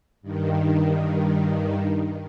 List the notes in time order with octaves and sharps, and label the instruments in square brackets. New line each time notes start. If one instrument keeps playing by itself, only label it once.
[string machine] G2 D#3